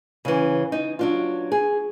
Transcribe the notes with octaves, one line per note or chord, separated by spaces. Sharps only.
C#3 E3
D#4
F#3 D4 F4
G#4